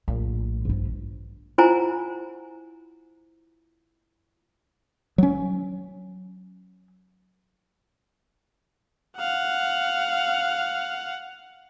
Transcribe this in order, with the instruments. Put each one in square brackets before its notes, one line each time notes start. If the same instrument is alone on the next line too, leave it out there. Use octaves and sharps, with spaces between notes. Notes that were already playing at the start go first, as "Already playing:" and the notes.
[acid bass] A#1 [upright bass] A2
[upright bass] G2 F3
[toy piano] E4 F4 C5 F#5 G#5 A#5
[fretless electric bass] F#3 C#4
[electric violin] F5 F#5